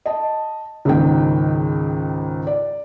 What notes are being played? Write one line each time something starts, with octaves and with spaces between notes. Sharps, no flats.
D#5 A5
C#2 G#2 D#3 A#3 G5
D5